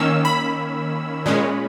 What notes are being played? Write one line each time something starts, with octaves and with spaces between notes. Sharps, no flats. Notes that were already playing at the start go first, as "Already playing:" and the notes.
Already playing: D#3 A#3 C#4 E6
B5
A#2 G#3 C#4